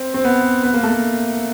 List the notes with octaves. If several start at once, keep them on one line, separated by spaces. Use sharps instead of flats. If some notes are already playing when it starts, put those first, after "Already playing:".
Already playing: C4
C4
B3
B3
A#3
A3